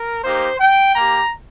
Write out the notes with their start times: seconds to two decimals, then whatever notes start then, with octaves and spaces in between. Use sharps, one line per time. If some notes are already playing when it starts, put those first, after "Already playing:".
Already playing: A#4
0.23 A#3 D#4 G4 C5
0.60 G5
0.95 A#3 G4 A#5